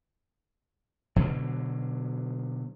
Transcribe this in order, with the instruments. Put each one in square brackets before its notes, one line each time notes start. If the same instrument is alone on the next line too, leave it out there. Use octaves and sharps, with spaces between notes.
[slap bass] B2 D3 F#3